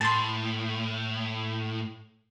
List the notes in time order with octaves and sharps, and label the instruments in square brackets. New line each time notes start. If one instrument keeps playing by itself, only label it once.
[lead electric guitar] A2 [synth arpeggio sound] A5 C6